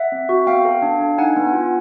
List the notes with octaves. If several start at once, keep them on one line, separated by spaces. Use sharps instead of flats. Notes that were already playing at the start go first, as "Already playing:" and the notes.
Already playing: E5 F#5
C4
F#4
B3 F5 G5
A4
D4
D4
D#4 F#5 G#5
B3
F4